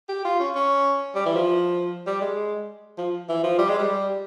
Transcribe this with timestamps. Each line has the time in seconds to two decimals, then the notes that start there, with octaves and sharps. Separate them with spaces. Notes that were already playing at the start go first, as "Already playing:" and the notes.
0.09 G4
0.25 F4
0.40 C#4
0.55 C#4
1.15 G3
1.26 E3
1.36 F3
2.07 G3
2.21 G#3
2.98 F3
3.29 E3
3.43 F3
3.58 G3
3.68 G#3
3.79 G3